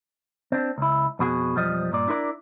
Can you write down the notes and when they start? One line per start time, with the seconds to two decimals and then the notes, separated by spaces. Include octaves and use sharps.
0.52 C4 D4
0.78 C#2 E4
1.19 F2 B2 F#4 G#4
1.56 B1 F2 F3 G3 D#5
1.91 G2 A#2 D5
2.08 D4 E4 A#4 B4 D5